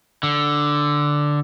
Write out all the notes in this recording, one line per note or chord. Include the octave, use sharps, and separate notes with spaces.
D3